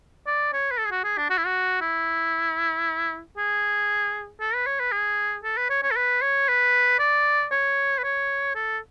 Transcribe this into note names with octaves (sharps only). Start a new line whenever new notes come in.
D5
C#5
B4
A4
G#4
F#4
G#4
D4
F#4
E4
F#4
E4
G#4
A4
B4
C#5
B4
G#4
A4
B4
C#5
C#5
A4
B4
C#5
B4
D5
C#5
B4
C#5
A4